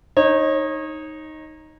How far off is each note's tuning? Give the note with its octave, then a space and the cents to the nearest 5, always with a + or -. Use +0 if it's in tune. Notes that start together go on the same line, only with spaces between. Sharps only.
D#4 +0 C#5 -30